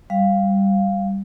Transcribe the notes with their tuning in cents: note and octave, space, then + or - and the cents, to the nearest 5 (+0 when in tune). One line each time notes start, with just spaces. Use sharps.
G3 +0 F5 +0